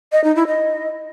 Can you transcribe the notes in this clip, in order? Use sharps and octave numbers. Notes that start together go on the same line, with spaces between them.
D#5
D#4
E4
D#5